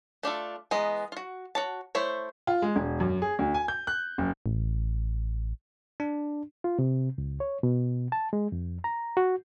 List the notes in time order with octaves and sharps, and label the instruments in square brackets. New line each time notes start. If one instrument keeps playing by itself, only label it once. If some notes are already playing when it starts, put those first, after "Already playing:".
[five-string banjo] A3 D4 F4 A4
E3 G#3 B3 D#5 A#5
F4 F#4
F#4 C#5 A5
A3 E4 C5 C#5
[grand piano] F4
G#3
E1
F#2
G#4
D2
G#5
G6
F#6
F#1
[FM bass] A1
[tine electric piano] D4
[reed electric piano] F4
C3
C#2
C#5
B2
A5
G#3
F2
A#5
F#4